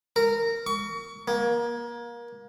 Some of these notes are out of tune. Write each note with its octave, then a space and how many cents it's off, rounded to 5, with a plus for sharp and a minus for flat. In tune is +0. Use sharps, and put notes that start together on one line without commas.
A#4 -15
C#6 +30
A#3 +25